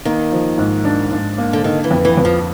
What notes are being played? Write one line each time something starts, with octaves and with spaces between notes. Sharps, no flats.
D#3 A#3
F3
G#2
D4
G#2
A#3
D3
D3 D#3
E3
F2
E3
F2
F3